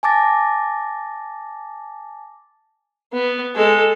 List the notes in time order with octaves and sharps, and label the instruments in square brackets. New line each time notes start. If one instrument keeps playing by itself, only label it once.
[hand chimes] G#5 A5 D6 A6 A#6
[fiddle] B3
G#3 A4